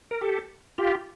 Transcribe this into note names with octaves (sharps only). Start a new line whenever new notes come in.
A#4
G4 A4
F4 G4